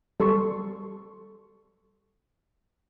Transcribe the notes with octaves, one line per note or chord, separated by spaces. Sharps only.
G3 A4 C6 C#6